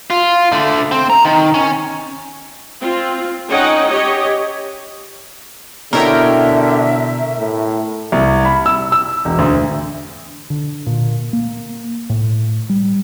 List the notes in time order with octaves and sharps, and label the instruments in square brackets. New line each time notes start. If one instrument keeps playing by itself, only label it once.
[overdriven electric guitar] F4
D3 A3
C4
A#5
D#3
C#4
[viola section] C4 F4
C#4 D#4 C#5 D#5 F#5 G5
G4 C#5 D#5
[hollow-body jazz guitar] B2 E4 [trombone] D3 [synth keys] A#4 C#5 G5 [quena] E5
[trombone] A2
[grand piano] C2
B5
E6
E6
E1
D2
[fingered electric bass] D3
A#2
A#3
A2
G3